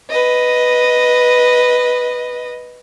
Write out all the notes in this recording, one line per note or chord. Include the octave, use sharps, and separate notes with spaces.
B4 D#5